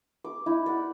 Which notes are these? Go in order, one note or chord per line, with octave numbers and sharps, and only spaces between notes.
D6
D#4 E4
D5 F#5